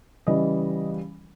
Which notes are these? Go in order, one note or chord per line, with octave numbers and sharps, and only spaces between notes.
C#3 E3 G3 D#5